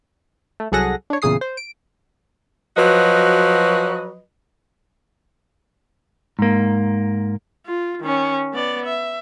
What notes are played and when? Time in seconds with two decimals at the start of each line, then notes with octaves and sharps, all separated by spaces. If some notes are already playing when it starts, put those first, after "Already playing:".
0.60 A3
0.72 C2 F#3 G#4 A4 F#5 A#6
1.10 D4 C#5
1.22 E2 A#2 C#3 G#4 D#6 C7
1.41 C5
1.57 D7
2.77 F3 F#3 F#4 B4 D#5
6.39 G#2 A#3
7.66 F4
8.01 D#3 C#4
8.54 B3 D5
8.85 E5